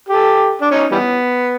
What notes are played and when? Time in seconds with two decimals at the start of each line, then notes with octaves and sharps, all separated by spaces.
0.09 G4 A4
0.62 D4
0.71 C#4 D#4
0.92 E3 G3 B3